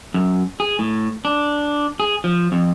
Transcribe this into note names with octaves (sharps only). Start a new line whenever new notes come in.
F#2
G#4
A2
D4
G#4
F3
F2